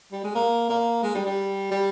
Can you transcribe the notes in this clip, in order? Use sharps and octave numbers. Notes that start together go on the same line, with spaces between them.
G3
G#3
A#3
A#3
G#3
G3
G3
G3